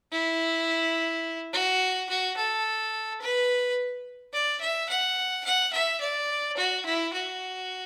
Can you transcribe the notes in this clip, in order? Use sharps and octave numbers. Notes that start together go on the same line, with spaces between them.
E4
F#4
F#4
A4
B4
D5
E5
F#5
F#5
E5
D5
F#4
E4
F#4